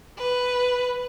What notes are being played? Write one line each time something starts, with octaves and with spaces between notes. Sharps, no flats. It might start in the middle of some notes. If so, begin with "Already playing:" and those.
B4